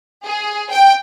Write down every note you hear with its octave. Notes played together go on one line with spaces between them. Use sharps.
G#4
G5